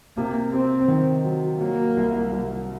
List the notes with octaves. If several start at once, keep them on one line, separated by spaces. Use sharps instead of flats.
C3 A#3
C3 C4
D#3
F#3
F#3 A#3
C2
C2